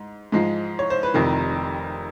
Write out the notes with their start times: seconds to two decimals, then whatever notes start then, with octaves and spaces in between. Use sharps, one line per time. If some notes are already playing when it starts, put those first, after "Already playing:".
Already playing: G#2
0.32 G#2 F3 G#3
0.79 C#5
0.90 C5
1.03 B4
1.14 F1 F2 C3 D#3 A#4